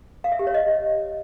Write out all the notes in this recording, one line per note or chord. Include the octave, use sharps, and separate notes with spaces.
F5
E5
G4
C#5
D#5